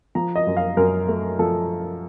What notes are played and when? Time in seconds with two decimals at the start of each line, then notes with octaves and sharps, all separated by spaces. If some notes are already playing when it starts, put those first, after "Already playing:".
0.15 F3 A#5
0.36 D#5
0.47 F#2
0.57 F5
0.77 F#2 A#4
1.08 A3
1.39 F3 A4